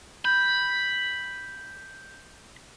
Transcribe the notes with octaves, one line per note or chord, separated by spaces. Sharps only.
B5 G6